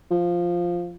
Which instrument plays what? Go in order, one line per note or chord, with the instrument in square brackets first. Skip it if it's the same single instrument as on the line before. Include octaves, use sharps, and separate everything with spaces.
[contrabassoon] F3